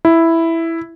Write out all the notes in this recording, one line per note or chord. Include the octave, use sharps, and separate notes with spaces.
E4